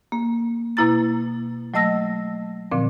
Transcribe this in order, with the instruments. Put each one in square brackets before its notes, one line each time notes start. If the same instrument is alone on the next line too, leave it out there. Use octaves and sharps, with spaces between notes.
[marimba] A#3
B2 A#3 E4 A#5 A6
F#3 A3 D#5 A5 E6 A#6
A#2 D3 F3 C4